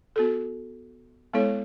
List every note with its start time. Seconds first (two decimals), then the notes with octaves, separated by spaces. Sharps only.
0.16 B3 F#4 A4
1.33 G#3 B3 E4 A4 C#5